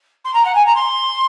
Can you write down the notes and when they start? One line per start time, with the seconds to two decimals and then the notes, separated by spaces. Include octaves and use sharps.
0.24 C6
0.34 A#5
0.45 F#5
0.55 G#5
0.66 A#5
0.75 C6